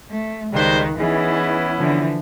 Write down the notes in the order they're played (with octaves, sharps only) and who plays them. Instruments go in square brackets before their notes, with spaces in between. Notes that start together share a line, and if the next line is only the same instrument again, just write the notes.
[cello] A3
[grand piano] C#2 F#6 [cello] D#3 [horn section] G3 G#3 C5
[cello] E3 [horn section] B3 C#4 E4 [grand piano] D#4 G#4
[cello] D3 E3 [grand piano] F3